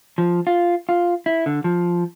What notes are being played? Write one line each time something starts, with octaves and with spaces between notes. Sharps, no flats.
F3
F4
F4
E4
D3
F3